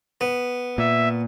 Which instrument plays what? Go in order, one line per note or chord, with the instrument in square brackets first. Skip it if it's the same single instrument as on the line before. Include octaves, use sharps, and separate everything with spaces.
[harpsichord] B3
[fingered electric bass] A#2 [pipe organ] E5